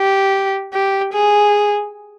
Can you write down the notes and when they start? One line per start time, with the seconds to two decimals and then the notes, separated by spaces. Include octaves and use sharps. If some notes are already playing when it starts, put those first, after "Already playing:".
Already playing: G4
0.73 G4
1.13 G#4